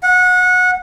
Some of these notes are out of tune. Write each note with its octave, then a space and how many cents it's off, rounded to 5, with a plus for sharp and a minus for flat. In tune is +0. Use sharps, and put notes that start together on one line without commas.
F#5 -25